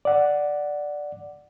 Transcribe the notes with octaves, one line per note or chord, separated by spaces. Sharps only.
D5 F#5